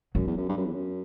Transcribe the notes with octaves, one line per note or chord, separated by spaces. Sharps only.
F#2 F#3
E2
F#2
G2
F#2
E2
F#2